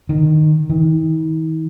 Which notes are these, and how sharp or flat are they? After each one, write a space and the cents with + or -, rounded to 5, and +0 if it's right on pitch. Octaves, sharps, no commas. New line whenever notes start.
D#3 -15
D#3 +45